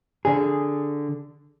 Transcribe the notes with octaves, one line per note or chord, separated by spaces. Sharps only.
D3 G#4